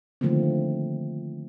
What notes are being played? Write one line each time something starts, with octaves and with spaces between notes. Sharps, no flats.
D3 D#3 F3 A3 A#3 C4